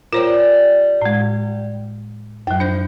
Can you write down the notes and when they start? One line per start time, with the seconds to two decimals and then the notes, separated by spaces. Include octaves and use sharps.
0.13 G3 F4 A#4 C5 C#5
1.02 A2 G#3
2.47 F#2 F3 F#3
2.60 D4 C5 G6